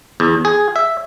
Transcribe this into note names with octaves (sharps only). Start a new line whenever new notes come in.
E2
G#4
E5